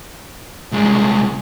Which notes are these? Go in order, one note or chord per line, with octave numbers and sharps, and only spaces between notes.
C2 G#3